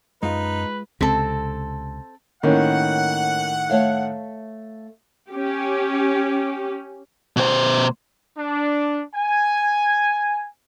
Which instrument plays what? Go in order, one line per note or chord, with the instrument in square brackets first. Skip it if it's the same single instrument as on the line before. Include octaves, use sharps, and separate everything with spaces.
[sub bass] F#2 [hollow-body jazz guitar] G#3 F4 F5 [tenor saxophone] D#4 [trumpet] B4
[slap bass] C#2 C3 [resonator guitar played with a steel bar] C4 A4
[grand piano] A2 D#3 [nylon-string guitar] A#3 C#4 [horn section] F#5
[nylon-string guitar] A3 C#5 F5
[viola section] C#4 G4
[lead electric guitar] B2 C5
[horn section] D4
G#5